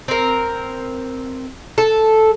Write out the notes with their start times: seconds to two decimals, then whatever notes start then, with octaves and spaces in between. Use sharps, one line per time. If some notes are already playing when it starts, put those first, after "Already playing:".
0.08 C4 A#4
1.78 A4